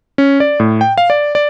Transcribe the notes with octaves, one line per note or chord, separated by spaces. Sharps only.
C#4
D5
A2
G5
F5
D5
D5